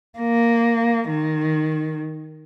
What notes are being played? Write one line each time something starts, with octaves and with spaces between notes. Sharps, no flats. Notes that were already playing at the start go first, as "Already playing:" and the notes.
A#3
D#3